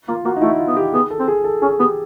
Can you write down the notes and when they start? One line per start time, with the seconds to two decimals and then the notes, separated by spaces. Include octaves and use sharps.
0.08 A#3 F4
0.25 A#3 F#4
0.37 D#4
0.41 A3 E4
0.59 F4
0.67 B3
0.77 G4
0.93 B3 G#4
1.11 A4
1.19 C4
1.28 G#4
1.44 A4
1.62 C#4 G#4
1.79 B3 G4